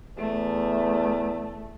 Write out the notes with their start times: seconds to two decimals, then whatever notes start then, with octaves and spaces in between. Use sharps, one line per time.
0.18 E2 A3